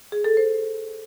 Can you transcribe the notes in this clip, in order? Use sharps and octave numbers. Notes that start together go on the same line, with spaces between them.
G#4
A4
C5